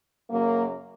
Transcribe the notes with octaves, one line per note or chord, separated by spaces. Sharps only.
F#2 C#3 F#3 A#3